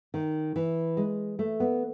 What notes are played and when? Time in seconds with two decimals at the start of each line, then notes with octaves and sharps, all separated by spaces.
0.14 D#3
0.56 E3
0.97 G#3
1.39 A3
1.60 B3